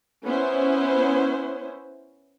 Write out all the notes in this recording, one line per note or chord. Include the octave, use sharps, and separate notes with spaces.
B3 C#4 E4 C5